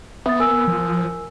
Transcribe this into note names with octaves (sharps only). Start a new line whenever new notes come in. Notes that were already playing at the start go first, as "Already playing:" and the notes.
B3 E5 D#6 A6
A#4 G#5 E6
F3